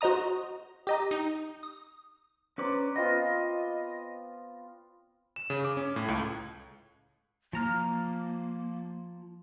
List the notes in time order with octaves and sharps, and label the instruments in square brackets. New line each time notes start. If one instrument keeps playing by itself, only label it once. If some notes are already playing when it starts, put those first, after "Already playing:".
[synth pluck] F#4 C5 D#5 A#5 D#6
G4 D#5 A#5
D#4
D#6
[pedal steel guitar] C#4 B4 D6 [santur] C5 D5 A#5
[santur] B3 C4 F4 [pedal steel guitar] D#5
[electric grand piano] E7
C#3
D6
C#4
A2
C#2
[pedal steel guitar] F3 A#5 F6 [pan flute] A#3